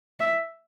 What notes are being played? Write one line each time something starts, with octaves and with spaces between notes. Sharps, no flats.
E5